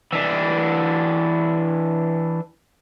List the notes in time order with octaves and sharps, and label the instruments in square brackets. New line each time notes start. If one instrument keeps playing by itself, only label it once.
[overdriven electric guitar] E3 D4